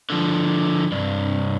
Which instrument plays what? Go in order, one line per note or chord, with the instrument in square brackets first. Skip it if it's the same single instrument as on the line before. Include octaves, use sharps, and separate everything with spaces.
[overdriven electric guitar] D3 F3
C2 G2